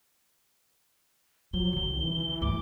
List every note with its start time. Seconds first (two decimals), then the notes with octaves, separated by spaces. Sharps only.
1.53 F3 F#3 G7
1.73 D3 D#3
1.89 C2
2.03 E3
2.42 D2 G2 D6